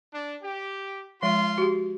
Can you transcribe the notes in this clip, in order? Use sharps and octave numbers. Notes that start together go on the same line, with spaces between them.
D4
G4
F3 G#3 F4 C6
F#4 G4